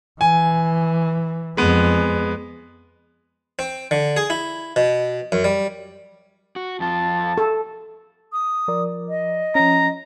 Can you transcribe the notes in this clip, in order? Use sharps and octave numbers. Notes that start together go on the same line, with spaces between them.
E3 G#5
F2 G#3 B3
C4
D3
G#4
E4
B2
F#2
G3
F#4
F2 F4 A5
A4
D#6
F3 A#4 D5
D#5
F3 C#4 A#5